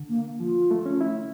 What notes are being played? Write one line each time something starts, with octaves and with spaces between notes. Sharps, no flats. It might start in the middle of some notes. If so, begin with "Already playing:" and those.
Already playing: D3
A#3
F3 F4
A3
C#4
E4